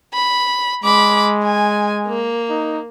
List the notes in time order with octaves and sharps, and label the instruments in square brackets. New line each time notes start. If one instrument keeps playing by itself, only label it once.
[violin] B5
[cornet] G#3 [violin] B5 D6
[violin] G#5
A#3
[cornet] D#4